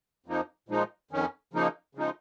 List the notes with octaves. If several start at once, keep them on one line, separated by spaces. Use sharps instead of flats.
F2 F3 A#3 D#4
A#2 F3 G#3 D#4
F2 D#3 C#4
C#3 F3 A#3 D#4
C#3 F3 G#3 D#4